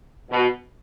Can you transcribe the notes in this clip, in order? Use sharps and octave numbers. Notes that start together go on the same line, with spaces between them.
B2